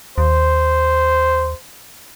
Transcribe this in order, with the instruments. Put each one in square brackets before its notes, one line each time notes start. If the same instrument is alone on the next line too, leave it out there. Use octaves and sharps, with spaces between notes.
[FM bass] D#2 [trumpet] C5